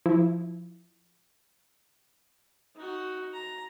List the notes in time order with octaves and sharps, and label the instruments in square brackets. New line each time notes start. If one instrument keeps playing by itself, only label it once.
[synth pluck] F3 E4
[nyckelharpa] D#4 F#4
A#5